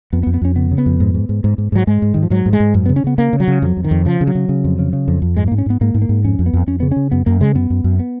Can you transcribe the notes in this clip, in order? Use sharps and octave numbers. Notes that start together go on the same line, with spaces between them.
F2 B3
B3
F2
B3
F2 C#4
C#3 B3
C#3
B3
F2
G#2
G#2
G#2
G#2
G#2
G#2 F#3
G#2 G#3
G#2
G#2 D#3
F3
G#2 F#3
G#2
G#3
G#2
F#2
C#3 B3
C#4
C#3 B3
C#3 A#3
C#3
F#3
C#3
F2 F#3
F2
D#3
F2
C#3 F3
C#3
F#3
C#3
C#3
F2
C#3
C#3
F2
F2
G#2 G#3
G#2 A#3
C#4
G#2 B3
G#2 A#3
G#2
A#3
G#2
F2 C#4
F2
B3
F2
F2 C#4
C#3 B3
C#3 C#4
F#2 B3
F#2 A#3
C#3 G#3
F#2 B3
F#2
F#2
B3